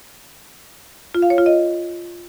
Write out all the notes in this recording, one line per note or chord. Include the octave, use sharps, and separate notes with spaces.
F4
F5
C#5
F4
D#5